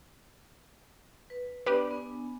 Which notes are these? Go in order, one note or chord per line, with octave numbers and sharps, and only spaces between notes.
B4
B3 D4 G4 B4 D5
B3 D4 G#5